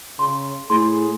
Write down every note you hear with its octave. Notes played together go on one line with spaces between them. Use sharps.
C#3 C6
A2 G#4 C6